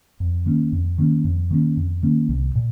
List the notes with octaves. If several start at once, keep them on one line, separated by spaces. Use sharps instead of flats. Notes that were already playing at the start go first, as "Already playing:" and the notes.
F2
D#3 A#3 C#4
F2
D#3 A#3 C#4
F2
D#3 A#3 C#4
F2
D#3 A#3 C#4
C2
A#2